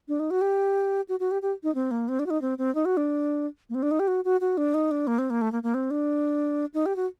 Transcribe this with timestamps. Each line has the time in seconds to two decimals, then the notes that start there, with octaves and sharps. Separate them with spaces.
0.08 D4
0.20 D#4
0.31 F#4
0.41 G4
1.09 F#4
1.20 F#4
1.31 G4
1.42 G4
1.63 D#4
1.75 C4
1.91 A#3
2.08 C4
2.19 D4
2.26 F#4
2.30 D#4
2.42 C4
2.58 C4
2.75 D#4
2.85 F#4
2.97 D4
3.69 A#3
3.75 C4
3.83 D4
3.91 D#4
4.00 G4
4.08 F#4
4.25 F#4
4.41 F#4
4.57 D4
4.74 D#4
4.91 D4
5.07 A#3
5.18 C4
5.30 A#3
5.41 A3
5.52 A#3
5.63 A#3
5.74 C4
5.91 D4
6.74 D#4
6.86 G4
6.96 F#4